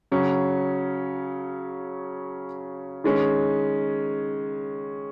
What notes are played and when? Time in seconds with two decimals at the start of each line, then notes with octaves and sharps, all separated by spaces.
0.12 C#3 F#3 C#4
3.04 D#3 G#3 C#4